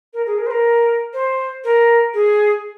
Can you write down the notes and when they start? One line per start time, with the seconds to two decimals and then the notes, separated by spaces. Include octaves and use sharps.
0.14 A#4
0.26 G#4
0.38 A#4
0.47 C5
0.51 A#4
1.13 C5
1.64 A#4
2.14 G#4